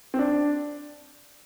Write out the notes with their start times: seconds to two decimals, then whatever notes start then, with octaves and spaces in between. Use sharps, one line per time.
0.14 C4
0.19 D4